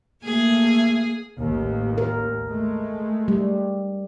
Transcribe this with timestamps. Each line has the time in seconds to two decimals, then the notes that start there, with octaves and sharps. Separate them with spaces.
0.24 A3 A#3 G#4
1.40 A1 D#2
1.98 A#4
2.48 G#3 A3
3.28 G3